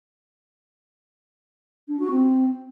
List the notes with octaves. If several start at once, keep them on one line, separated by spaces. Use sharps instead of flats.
D4
F#4
C4